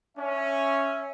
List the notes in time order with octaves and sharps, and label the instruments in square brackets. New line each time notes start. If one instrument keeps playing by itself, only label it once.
[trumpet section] C#4 [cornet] E5